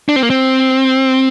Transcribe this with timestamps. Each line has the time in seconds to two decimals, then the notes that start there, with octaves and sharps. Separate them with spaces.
0.09 D4
0.16 C4
0.23 A#3
0.30 C4